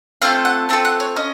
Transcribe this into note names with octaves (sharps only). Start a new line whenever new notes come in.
A3 C4 F4 A4 F5
F#5
A3 C4 F4 A4 A5
F#5
C#5
C#4 D#5